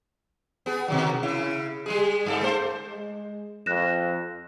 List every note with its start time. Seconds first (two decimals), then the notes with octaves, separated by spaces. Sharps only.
0.66 B3 G#4
0.88 B2 D#3 F#3
1.23 C#3 E4
1.86 G3 G#3 G#4
2.26 G2 A4
2.41 A3 C5
2.88 G#3
3.66 F2 F#6 A#6 E7